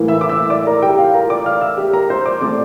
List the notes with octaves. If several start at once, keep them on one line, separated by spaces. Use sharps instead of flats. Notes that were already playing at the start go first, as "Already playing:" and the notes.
Already playing: A2 E3 A#3
E5 E6
D6
E5 E6
D5 D6
A#4 A#5
G4 G5
F4 F5
A#4 A#5
D5 D6
F5 F6
E5 E6
G4 G5
A#4 A#5
C5 C6
D5 D6
A#2 A3 C4 D5 D6